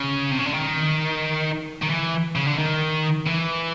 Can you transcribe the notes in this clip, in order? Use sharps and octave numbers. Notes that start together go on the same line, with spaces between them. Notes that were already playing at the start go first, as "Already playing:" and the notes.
Already playing: C#3
C3
C#3
D3
D#3
D#3
E3
C#3
D3
D#3
E3